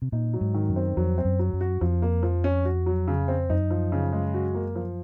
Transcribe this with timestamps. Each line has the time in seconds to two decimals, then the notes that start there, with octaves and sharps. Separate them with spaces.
0.02 C3
0.12 A#2 D#4
0.33 F#3
0.41 G#2
0.54 D#3
0.69 F#2
0.76 C4
0.97 F2 F#3
1.18 C4
1.25 F#2
1.39 F#3
1.53 F#2
1.61 F#4
1.81 F2 F3
2.02 A#3
2.23 F3
2.44 C#4
2.65 F#4
2.86 F#3
3.08 C#3
3.28 C4
3.50 F#2 D#4
3.71 F3
3.92 C#3
4.13 G#3
4.34 F#4
4.54 A#3
4.75 F3